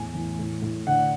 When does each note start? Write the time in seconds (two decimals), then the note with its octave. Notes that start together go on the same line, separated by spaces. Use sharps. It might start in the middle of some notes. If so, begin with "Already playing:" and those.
Already playing: E2 A2 G#5
0.15 E3
0.39 A2
0.62 A2
0.87 D3 F#5